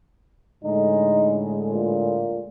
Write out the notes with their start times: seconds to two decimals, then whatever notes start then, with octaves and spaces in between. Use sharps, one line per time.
0.64 A2 D3 G#3 D#4
1.72 A#2